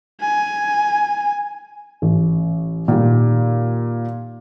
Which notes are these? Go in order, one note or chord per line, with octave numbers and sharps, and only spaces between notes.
G#5
A1
A#2 D#3 G3